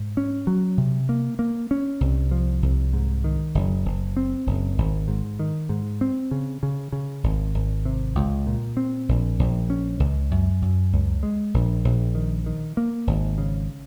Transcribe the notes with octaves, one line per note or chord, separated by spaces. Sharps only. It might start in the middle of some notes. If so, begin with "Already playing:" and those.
Already playing: G#2
C#4
F#3
C3
A#3
A#3
C#4
C2
F3
C2
G#2
D#3
F#1
F#1
C4
F#1
G#1
G#2
D#3
G#2
C4
C#3
C#3
C#3
G#1
G#1
C3
C#2
A#2
C4
A#1
A#1
C#4
C#2
F#2
F#2
C#2
G#3
A#1
A#1
D#3
D#3
A#3
G#1
C#3